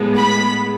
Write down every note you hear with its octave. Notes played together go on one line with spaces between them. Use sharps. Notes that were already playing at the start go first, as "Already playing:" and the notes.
Already playing: A2 G#3 B3
B5